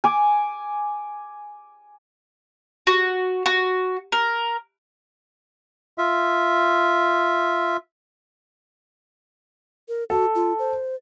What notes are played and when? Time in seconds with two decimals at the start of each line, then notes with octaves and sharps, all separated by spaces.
0.04 G#5 D6
2.87 F#4
3.46 F#4
4.12 A#4
5.98 F4 E5
9.88 A#4
10.10 F#4 A4
10.35 F4
10.59 C5